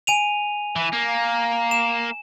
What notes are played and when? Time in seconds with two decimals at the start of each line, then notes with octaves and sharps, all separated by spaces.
0.07 G#5 D#7 F7
0.76 E3
0.93 A#3
1.71 E7